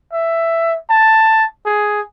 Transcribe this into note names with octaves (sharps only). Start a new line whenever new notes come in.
E5
A5
G#4